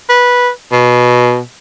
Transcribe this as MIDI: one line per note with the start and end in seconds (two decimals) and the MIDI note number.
0.09 0.49 71
0.72 1.40 47